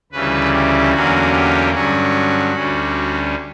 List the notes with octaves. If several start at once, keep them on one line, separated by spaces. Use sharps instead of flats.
D2 C#3 E3 G3 B4
G4
E2 D3 F#3 A#3 C#4 F#4
G4
G2 D3 F#3 C#4 F#4
D2 D3 G3 C#4